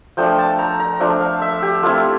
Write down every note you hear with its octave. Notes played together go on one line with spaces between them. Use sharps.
F3 A3 D4 G5
A5
A#5
A#5
F3 A3 D4
F5
E5
G4
A3 C4 E4 F4